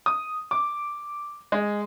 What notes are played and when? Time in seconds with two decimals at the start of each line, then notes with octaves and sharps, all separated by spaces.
0.06 D#6
0.51 D6
1.52 G#3